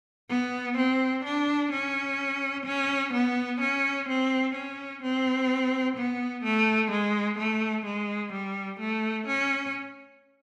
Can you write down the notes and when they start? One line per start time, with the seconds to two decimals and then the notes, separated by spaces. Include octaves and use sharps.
0.29 B3
0.77 C4
1.24 D4
1.72 C#4
2.65 C#4
3.13 B3
3.60 C#4
4.08 C4
4.55 C#4
5.02 C4
5.96 B3
6.44 A3
6.91 G#3
7.38 A3
7.85 G#3
8.32 G3
8.80 A3
9.27 C#4